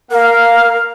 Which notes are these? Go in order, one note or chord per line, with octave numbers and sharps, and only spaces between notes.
A#3 A#4 F5